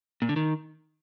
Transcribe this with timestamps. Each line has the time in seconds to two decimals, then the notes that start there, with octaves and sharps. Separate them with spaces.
0.22 A#2
0.29 D3
0.36 D#3